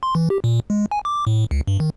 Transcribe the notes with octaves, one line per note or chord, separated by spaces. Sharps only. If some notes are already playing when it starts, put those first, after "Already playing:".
C6
E3
G4
A#2
G#3
G#5
D6
A2
C#2
G2
D#3